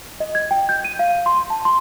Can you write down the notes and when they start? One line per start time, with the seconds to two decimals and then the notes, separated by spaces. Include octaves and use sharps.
0.20 D#5
0.35 G#6
0.51 G5
0.69 G6
0.85 D#7
0.99 F5
1.26 C6
1.50 A5
1.65 C6